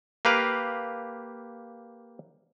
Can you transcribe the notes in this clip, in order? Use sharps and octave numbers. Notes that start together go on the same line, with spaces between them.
A#3 G4 B4 F5